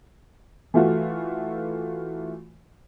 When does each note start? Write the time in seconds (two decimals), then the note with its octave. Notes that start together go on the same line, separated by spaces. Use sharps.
0.74 E3 A3 F4 F#4